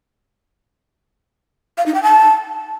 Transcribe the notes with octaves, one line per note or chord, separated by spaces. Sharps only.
F5
D#4
G5
A5